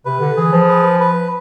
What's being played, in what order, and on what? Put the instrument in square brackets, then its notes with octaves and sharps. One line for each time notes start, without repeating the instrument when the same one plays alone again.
[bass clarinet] C3 [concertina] B4
[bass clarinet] D3
[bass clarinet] E3 [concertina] G#4
[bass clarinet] F3
[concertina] B4
B4